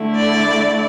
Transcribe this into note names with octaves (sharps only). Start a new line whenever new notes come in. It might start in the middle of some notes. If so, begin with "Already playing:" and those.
Already playing: D3 A3 E4
D5